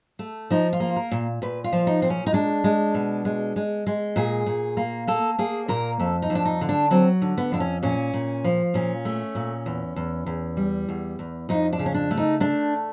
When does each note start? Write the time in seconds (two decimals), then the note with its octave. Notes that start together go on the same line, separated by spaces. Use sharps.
0.19 A3
0.50 F3 D#4
0.73 F4
0.80 A#3
0.96 A#4
1.11 A#2
1.42 A#2 B4
1.64 F4
1.73 F3
1.87 D#4
2.02 A#2 C4
2.10 C#4
2.27 D#4
2.33 G#3 D4
2.64 G#3
2.94 B2
3.25 G#3
3.56 G#3
3.87 G#3
4.16 A#2 G#4
4.46 A#2
4.77 A#3
5.07 A#3 A4
5.39 A#3 G#4
5.68 A#2 A#4
6.00 F2 A4
6.22 D#4
6.30 F2
6.35 D4
6.45 D#4
6.61 D3
6.69 D4
6.91 F#3 C4
7.22 D3
7.38 B3
7.52 F2 D4
7.60 C#4
7.83 A#2 C#4
8.14 A#2
8.44 F3
8.74 A#2 C#4
9.05 A3
9.35 A#2
9.66 E2
9.96 E2
10.26 E2
10.57 G3
10.89 E2
11.19 E2
11.49 F2 D#4
11.73 D4
11.79 C#3
11.86 C#4
11.94 D4
12.11 A3
12.18 D#4
12.40 A3 D4